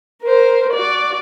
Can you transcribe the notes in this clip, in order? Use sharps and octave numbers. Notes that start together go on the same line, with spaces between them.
A#4 C5
F#4 D5